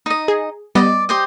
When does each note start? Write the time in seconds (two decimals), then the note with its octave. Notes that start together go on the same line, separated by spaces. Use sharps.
0.06 D#4 D#5
0.28 G#4
0.75 G3 B3 D5 D#5
1.09 G4 C5 D#5